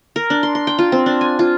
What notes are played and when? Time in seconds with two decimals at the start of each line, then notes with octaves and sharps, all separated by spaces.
0.16 A#4
0.30 D4
0.43 C6
0.55 C6
0.67 G5
0.79 F4
0.92 C4
1.06 D4
1.21 G#5
1.39 F4